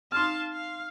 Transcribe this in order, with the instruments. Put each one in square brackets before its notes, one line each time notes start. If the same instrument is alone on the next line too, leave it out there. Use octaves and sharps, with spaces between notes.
[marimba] C4 D#4 [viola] F5 A5 [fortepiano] C6 F6
[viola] F5